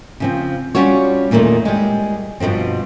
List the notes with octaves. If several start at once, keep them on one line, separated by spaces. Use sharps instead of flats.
C#3 F3 C4
G3 C#4 F4 F#4 C#5
E2 A#2 D#3 G#3 A3
G3 G#3
G2 B2 D#3 F3 C4